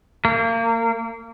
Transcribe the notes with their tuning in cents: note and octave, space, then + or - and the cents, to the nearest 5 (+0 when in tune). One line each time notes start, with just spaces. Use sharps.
A#3 -30